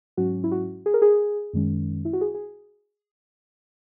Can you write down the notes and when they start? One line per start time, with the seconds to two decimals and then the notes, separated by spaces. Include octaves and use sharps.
0.17 G#2 F#3 C#4 F#4
0.44 E4
0.52 F#4
0.86 G#4
0.94 A#4
1.02 G#4
1.53 F#2 D#3 G#3 C#4
2.05 E4
2.13 F#4
2.21 G#4
2.35 G#4